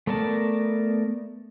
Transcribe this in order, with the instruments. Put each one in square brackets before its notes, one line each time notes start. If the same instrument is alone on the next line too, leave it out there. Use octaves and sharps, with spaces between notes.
[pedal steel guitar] A3 B3 A#4 D5 A5